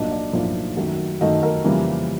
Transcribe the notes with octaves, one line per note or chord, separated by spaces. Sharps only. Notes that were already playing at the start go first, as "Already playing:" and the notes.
Already playing: B1 A2 F3 A#3 D4 D#5
D5
B1 A2 F3 A#3 D4
F#2 D#3 F#3 A3
F#2 D#3 F#3 A3 D#5
A#4
F2 C#3 E3 G3 A#3